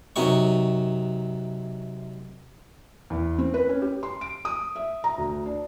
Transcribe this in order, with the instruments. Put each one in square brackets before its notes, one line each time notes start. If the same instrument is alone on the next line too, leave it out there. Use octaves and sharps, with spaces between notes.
[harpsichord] F#2 C3 D#4 C#6
[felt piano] E2
C4
B4
C#4
G4
C6
D7
D#6
E5
A#5
D2
D4